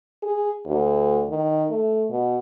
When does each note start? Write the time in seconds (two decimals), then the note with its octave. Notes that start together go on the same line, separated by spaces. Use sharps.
0.22 G#4
0.66 D2
1.29 D#3
1.70 A3
2.10 B2